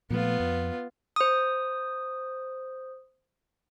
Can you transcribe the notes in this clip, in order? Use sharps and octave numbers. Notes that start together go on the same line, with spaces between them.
A#2 F3 A3 B3 F4
F2
C5 D#6